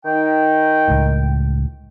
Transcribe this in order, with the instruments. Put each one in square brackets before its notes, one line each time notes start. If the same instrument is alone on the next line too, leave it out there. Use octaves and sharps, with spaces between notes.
[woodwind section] D#3 D#4 G5
[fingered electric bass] C#2 A2